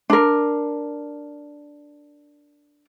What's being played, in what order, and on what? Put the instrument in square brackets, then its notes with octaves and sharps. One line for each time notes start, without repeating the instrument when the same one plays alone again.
[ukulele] D4 A#4